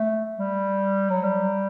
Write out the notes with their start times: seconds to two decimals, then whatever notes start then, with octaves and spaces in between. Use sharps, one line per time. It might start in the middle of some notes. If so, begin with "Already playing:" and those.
Already playing: A3
0.38 G3
1.10 F#3
1.23 G3